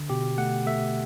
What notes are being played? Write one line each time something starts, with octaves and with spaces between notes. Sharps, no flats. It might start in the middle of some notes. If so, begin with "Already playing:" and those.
Already playing: D3
B2 G4
A3 F#5
A3 E5